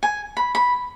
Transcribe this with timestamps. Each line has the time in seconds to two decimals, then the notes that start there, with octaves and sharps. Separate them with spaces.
0.03 G#5
0.37 B5
0.55 B5